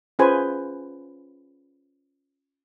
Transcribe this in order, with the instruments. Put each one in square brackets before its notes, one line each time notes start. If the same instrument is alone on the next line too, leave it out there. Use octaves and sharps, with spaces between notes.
[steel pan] C#4 F4 G#4 B4 C5 G#5